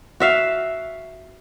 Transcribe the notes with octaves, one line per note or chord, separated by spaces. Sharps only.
F#4 E5 F5